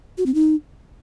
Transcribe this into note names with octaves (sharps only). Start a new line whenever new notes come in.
F#4
C4
D#4